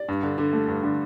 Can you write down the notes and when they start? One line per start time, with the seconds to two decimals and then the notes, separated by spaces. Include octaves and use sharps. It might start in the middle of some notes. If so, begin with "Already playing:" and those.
Already playing: D5
0.08 G2
0.23 D3
0.38 D3
0.53 A3
0.68 G2
0.83 D3